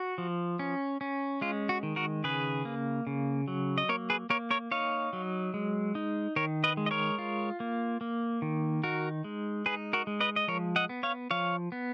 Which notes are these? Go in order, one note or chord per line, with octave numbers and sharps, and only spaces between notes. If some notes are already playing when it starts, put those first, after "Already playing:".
Already playing: F#4
F3
C#4
C#4
G#3 F4
F#4
D#3
F#4 A#4
C#3 G#4 B4
A#3
C#3
F#3
D#5
A#3 A#4 C#5
G#4 B4
A#3 A#4 C#5
A#4 C#5
D#4 C#5 F5
F#3
G#3
D#4
D#3 A#4 C#5
B4 D#5
G#3
D#5
A#4 C#5
F4
A#3
A#3
D#3
D#4 F#4 A#4
G#3
D#4 G#4 B4
F#4 A#4
G#3
B4 D#5
D#5
F3 A#4 C#5
D#5 F#5
B3
C#5 F5
F3 C#5 F5
B3